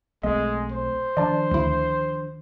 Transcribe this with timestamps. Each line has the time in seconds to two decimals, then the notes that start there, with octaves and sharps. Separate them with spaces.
0.23 B1 G#3 A3 C4 D#5
0.72 C5
1.17 D#3 F3 D4 D5 A5
1.51 D2 E4